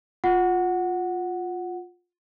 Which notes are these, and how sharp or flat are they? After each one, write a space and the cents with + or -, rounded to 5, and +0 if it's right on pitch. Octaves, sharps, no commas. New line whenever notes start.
F4 +15 F#5 +0